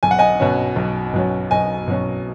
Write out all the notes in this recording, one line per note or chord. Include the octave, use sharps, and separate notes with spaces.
B1 G#5
F#5
D#5 G#5
B2 F#3 C#4
B1
B2 F#3 C#4
B1 D#5 G#5
B2 F#3 C#4